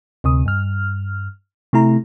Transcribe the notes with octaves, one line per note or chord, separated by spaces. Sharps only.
D2 C3 D#6
G2 F6
C3 A3 E4 A#5